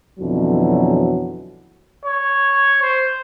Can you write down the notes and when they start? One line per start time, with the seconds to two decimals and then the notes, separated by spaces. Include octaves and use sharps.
0.20 F2 B2 D3 E3 F#3
2.05 C#5
2.83 C5